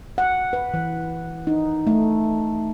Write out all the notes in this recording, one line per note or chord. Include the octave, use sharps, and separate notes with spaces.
F#5
B4
E3
D#4
A3